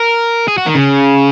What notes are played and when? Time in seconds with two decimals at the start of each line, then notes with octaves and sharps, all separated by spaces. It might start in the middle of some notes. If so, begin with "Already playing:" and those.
Already playing: A#4
0.48 G#4
0.58 F#4
0.66 D#3
0.75 C#3